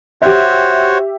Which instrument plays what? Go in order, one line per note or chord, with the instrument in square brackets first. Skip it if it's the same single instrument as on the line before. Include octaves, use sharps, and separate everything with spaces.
[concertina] F#4 C5 C#5 [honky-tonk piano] G4 E5